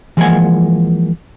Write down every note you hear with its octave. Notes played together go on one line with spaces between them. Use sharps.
E3 F3 G#3 A#3 F#5 G#5